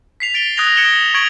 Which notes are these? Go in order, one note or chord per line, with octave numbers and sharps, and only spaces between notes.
B6 C7 F7
A6 D7 F7 G7
D#6 F#6 G#6 A#6 F7
D#6 G#6 C#7 D7 E7 G7
C#6 G#6 D7 F7 F#7